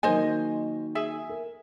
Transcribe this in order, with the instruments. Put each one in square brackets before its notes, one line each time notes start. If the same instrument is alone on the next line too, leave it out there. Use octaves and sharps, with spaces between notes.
[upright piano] D#3 F#3 A#3 [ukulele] C5 D#5 G#5
[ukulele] G#4 E5 G#5
[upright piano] A#4